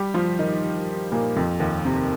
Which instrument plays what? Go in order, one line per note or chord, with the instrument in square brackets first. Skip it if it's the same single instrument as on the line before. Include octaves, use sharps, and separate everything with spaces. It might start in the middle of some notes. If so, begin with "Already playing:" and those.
Already playing: [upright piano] G3 G4
F3 F4
D#3 D#4
A#2 A#3
F2 F3
D#2 D#3
C3